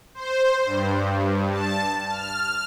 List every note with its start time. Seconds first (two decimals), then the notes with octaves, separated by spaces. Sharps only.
0.14 C5
0.66 G2
1.51 A5
2.09 F6